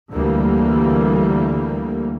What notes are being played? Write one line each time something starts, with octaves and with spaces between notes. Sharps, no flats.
D2 D3 E3 G3 A#3